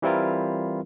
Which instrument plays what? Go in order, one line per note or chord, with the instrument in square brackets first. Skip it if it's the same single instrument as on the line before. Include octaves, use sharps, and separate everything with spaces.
[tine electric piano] E3 G3 C4 E4 F4 A#4